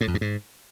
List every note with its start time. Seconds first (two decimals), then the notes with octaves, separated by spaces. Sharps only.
0.01 A2
0.08 F2
0.14 G2
0.21 G#2